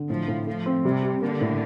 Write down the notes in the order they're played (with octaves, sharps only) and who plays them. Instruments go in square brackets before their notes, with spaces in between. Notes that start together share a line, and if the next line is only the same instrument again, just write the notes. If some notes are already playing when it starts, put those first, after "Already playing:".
Already playing: [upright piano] D3
[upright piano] A2 [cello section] F3
[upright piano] A2
[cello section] F3 [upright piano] A3
[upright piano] C4
[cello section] C3 [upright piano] G3
[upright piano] G4
[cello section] D3 [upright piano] A#3
[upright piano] A2